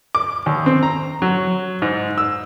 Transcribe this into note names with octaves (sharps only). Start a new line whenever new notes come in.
D6
D#2
C4
A#5
F#3
G#2
E6